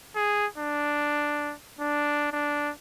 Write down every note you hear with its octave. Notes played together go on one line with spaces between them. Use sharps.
G#4
D4
D4
D4